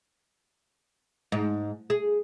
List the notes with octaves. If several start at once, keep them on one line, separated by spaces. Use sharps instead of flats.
G#2
G#4